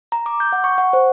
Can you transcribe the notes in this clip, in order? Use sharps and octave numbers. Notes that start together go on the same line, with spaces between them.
A#5
D6
G6
F#5
C#6
F#5
C5